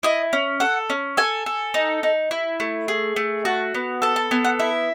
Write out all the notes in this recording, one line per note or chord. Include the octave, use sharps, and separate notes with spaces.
E4 D#5
C#4
A4 F#5
C#4
A4 G#5
A4
D#4
D#4
E4
A3
G#4
A3
F#4 A5
B3
A4 A5
A5
B3 G#5
F#5
E4 E5